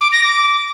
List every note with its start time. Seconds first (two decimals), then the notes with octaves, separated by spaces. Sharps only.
0.01 D6
0.12 A#6
0.24 D6